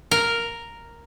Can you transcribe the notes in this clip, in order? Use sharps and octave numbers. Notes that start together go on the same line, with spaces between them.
A#4